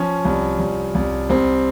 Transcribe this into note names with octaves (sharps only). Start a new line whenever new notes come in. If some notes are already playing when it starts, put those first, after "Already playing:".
Already playing: F3 C#4
C2
C2
C2
C2 C4